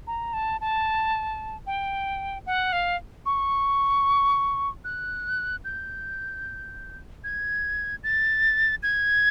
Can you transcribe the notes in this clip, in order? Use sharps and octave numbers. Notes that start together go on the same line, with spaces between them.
A#5
A5
A5
G5
F#5
F5
C#6
F#6
G6
G#6
A6
G#6